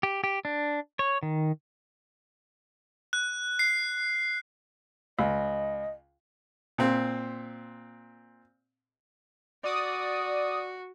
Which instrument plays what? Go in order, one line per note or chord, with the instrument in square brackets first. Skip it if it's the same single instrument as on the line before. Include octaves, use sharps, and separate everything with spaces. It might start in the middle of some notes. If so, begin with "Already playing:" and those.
[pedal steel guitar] G4
G4
D4
C#5
D#3
[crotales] F#6
C7
[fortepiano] C#2 [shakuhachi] D#5
[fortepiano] A#2 C4
[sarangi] F#4 [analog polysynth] D5 D#6